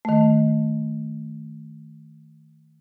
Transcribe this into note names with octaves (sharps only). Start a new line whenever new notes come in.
D#3 A3